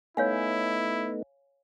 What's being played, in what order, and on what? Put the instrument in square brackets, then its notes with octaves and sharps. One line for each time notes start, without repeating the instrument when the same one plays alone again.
[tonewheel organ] A3 B3 D#4 [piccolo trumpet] E4 [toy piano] C#5 F5 G#5